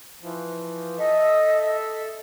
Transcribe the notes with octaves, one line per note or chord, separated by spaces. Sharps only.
E3 F3
A4 D#5 E5